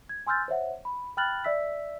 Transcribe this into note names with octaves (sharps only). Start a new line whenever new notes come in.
G#6
G#5 C6 E6 F6 G6 A6
C5 C#5 E5 F#5
B5
G5 B5 F6 F#6 A6 F#7
D5 E5 E6 B6